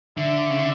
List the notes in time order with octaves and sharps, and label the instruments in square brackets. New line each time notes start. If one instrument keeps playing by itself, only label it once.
[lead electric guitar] D3 [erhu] E5
[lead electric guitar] C#3
D3